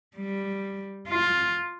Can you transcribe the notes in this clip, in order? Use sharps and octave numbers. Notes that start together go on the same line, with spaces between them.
G3
F4